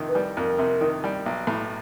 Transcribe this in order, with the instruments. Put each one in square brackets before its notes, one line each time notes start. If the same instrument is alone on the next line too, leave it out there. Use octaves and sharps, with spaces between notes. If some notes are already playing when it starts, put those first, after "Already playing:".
Already playing: [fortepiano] F2 C3 D#3
[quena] B4
[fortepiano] G3
[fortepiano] F2 [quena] A#4
[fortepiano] C3
D#3
G3
B1
A2